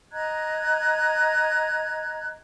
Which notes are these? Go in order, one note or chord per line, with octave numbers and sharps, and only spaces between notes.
D#5 A#5 F#6 G#6